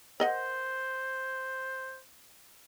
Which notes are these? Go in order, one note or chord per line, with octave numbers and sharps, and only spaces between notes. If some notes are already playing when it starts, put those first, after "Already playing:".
A#4 C5 D#5 F#5